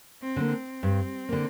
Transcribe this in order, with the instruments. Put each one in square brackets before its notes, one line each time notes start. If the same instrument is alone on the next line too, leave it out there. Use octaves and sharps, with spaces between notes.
[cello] C4
[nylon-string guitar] D3 A#3
[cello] C4
[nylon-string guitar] G2
D3 A#3